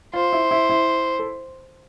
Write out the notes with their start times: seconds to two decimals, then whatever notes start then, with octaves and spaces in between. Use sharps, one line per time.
0.13 F4 C5
0.33 E4
0.51 E4
0.70 E4
1.19 A4